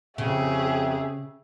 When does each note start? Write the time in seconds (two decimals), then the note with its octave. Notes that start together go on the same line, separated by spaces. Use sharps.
0.18 F2 C#3 G4 G#4 E5